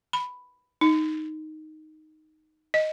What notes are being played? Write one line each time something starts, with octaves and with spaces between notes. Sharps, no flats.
B5
D#4
D#5